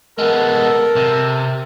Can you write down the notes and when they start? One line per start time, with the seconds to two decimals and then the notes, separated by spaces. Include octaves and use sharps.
0.18 G#3 B3 A4 A#4
0.96 C3